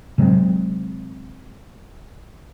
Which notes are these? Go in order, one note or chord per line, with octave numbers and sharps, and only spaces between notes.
C3 F#3 G#3 C4